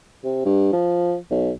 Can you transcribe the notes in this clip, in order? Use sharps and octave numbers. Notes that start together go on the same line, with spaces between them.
C3
G2
F3
B1